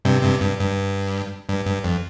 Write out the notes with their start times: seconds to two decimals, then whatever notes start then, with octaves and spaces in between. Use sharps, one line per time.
0.05 G2 C3
0.23 G2 C3
0.41 G2
0.59 G2
1.49 G2
1.66 G2
1.84 F2